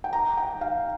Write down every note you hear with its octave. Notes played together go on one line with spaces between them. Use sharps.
G5
A#5
G5
F5